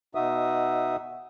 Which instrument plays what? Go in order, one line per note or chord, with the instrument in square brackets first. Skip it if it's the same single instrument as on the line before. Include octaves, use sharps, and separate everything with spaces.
[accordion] B2 D#4 F#4 E5 D#6